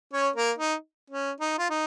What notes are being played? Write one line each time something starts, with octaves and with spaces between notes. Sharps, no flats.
C#4 C#5
A#3 A#4
D#4
C#4
D#4
F4
D#4